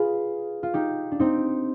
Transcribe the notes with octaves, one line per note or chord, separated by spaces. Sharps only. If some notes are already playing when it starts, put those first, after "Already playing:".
Already playing: F4 G#4 B4
F4
D#4 G4
D4
C4 D#4